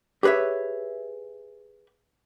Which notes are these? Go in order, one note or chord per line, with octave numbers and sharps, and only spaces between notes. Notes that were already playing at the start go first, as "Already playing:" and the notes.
G4 G#4 B4 C#5 E5